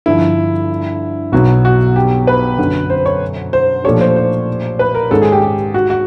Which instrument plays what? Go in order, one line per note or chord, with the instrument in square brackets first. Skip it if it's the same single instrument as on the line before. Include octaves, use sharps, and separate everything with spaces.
[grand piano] G2 D3 F3 [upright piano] E4
[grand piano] B1 B2 F#3 B3 [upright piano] F#4
[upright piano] F#4
G4
B4
[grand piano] F#2 D3 F#3
[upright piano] C5
C#5
C5
[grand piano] A#2 F3 A3 D4 G4 [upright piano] C#5
[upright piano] C5
C5
B4
A#4
[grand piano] G#2 D#3 G#3 C#4 [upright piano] A4
[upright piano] G#4
G4
G4
F#4
F#4